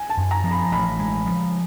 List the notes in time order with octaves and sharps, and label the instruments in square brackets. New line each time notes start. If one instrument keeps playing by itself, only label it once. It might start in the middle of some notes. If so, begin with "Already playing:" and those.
Already playing: [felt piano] G#5
A5
[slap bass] F#2
[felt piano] A#5
[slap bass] F3
[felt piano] B5
[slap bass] A1 [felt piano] B5
[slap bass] G#3
F3